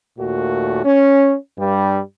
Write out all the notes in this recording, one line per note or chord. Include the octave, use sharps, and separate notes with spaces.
D#2 A#2 A3 F#4
C#4
G2 G3